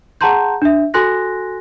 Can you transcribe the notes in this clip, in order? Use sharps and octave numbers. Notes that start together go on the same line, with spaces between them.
G#4 F#5 A5 A#5 C6 G6
D4 E5
F#4 A4 G#5 C6 F#6 A#6